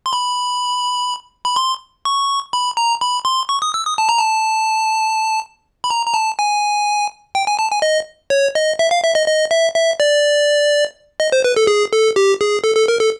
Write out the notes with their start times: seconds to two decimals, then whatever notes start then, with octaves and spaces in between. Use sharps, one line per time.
0.06 C6
0.13 B5
1.45 B5
1.56 C6
2.05 C#6
2.53 B5
2.77 A#5
3.01 B5
3.25 C6
3.49 C#6
3.62 D#6
3.74 E6
3.85 D#6
3.98 A5
4.09 A#5
4.19 A5
5.84 B5
5.90 A#5
6.06 A#5
6.14 A5
6.39 G#5
7.35 G5
7.47 G#5
7.59 A5
7.71 G#5
7.82 D#5
8.30 C#5
8.55 D#5
8.79 E5
8.91 F5
9.04 E5
9.15 D#5
9.28 D#5
9.51 E5
9.75 E5
10.00 D5
11.20 D#5
11.32 C5
11.44 B4
11.56 A4
11.67 G#4
11.93 A4
12.16 G4
12.41 G#4
12.64 A4
12.76 A4
12.88 A#4
13.01 A4